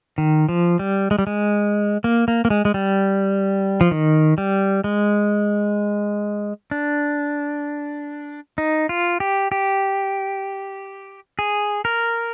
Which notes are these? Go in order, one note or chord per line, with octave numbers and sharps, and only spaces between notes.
D#3
F3
G3
G#3
G3
G#3
A#3
A#3
A#3
G#3
G#3
G3
F3
D#3
G3
G#3
D4
D#4
F4
G4
G4
G#4
A#4